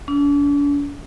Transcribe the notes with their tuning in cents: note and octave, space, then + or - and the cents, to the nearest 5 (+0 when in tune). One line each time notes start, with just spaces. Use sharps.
D4 -45